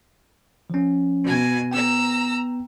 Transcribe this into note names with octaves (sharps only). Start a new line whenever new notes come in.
F3 C#4
B2 G#5
B3 G5 A#5 E6